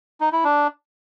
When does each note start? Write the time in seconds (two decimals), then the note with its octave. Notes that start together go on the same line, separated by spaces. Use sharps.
0.21 D#4
0.32 E4
0.44 D4